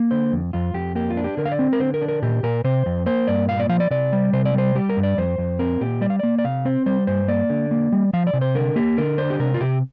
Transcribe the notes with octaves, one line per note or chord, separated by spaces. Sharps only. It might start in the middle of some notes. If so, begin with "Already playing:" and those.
Already playing: A#3
D3 C5
F2
F2 F4
F2 G4
A#3 G4
F4
D4
G4
D3 A#4
F5
D5
C4
A#4
D3 C5
A#4
D4
A#4
A#2 G4
A#2 A#4
C3 C5
F2
A#3 C5
G2 D5
A#2 F5
D5
F3 F5
D5
C3 D5
G3
C3 C5
D5
G3 C5
G3 G4
A#4
G2
D5
F2 C5
F2
C4 A#4
A#2 G4
G3 D5
F5
A#3 D5
D5
C3 F5
C4 C5
G3 C5
G2 C5
A#3 D5
D3
A#3
G3
F3 F5
D5
C3
C5
D3 A#4
A#3 G4
D3 A#4
D4 C5
G4
C3 A#4
F4
C3 G4